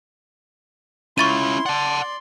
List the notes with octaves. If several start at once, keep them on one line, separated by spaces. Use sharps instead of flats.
C#4 E4 F4 C6 C#6 A6 D#7
D5 F#5 A5